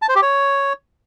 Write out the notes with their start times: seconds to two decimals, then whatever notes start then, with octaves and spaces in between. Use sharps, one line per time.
0.02 A5
0.09 C5
0.15 G4
0.22 C#5